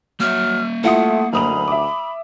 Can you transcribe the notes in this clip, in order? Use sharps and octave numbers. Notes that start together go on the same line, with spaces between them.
F#3 A#3 E5 F6
A3 E4 F4 F#5 D#6
F#1 D2 B5 D#6 F7
E5 D6